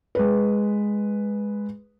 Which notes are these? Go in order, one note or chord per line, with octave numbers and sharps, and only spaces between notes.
G#3 B4